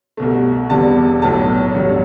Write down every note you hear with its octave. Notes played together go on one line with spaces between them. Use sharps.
C2 B2 A3
E1 E2 C3 G3 A5
B1 A2 F#3 A3 A5
A1 G2 D3 F#3